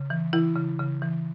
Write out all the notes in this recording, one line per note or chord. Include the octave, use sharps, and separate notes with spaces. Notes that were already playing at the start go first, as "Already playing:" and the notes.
Already playing: C#3
E3
E3 E4
C#3
C#3
E3